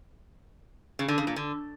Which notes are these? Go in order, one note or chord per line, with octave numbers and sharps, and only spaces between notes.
C#3
D3
C#3
A#2
D3